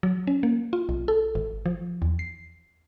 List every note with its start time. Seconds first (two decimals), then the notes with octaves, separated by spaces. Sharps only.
0.03 F#3
0.27 C#4
0.43 A#3
0.73 F4
0.89 B1
1.08 A4
1.35 G#1
1.66 F3
2.02 E2
2.19 C7